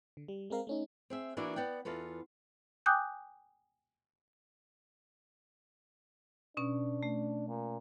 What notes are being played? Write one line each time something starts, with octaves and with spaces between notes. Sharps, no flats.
D3
G3
G#3 C4 A#4 F5
A3 C#4 D#4
C4 G#4 E5
E3 A#3 B3 D4 E4 F#4
B3 D5 F#5 G5
E2 F4 A4 B4
G5 G#5 D6 D#6 F#6 G6
B2 C#4 D4
A3
A#2